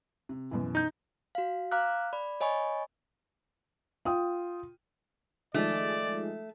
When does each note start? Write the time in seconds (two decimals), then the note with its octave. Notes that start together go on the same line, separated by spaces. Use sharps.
0.29 C3
0.51 F#2 B2 E3
0.75 D#4 G6
1.35 F#4 F5
1.71 F5 A#5 D6 F6 F#6
2.13 D5 B5
2.41 C#5 D#5 G#5 B5 C#6
4.05 F4 G5 D#6
5.54 D#3 F3 G#3 A3 D5